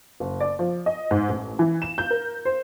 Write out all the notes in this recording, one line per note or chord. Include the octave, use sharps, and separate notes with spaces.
F#1
D5
F3
D#5
G#2
A1
E3
E7
G6
A#4
C5